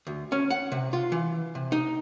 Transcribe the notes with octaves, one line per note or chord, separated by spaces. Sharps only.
D2
C#4
F#5
C3
F4
E3
C3
D#4